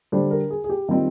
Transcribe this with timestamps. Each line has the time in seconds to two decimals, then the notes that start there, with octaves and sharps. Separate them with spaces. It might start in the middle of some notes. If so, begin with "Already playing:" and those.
0.12 D3 G3 D4 C5
0.31 A#4
0.50 G#4
0.64 G#4
0.69 G4
0.88 D#3 G3 C4 D#4 F4